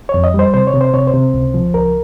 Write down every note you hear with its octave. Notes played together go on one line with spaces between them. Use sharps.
C#5
F2
D#5
G3 C5
C3 C5
C#5
C3
C5
C3 C#5
C5
C3
C#2
F3
C#2 A#4